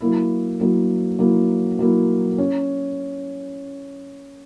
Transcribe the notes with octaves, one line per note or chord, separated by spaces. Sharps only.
F#3 A#3 E4
F#3 A#3 E4
F#3 A#3 E4
F#3 A#3 E4
C#4